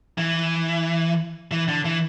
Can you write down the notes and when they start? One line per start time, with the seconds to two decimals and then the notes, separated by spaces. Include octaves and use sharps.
0.18 E3
1.51 E3
1.68 D3
1.85 E3